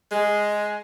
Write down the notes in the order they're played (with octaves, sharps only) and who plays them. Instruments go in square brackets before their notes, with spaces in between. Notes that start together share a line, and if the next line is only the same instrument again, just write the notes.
[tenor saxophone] G#3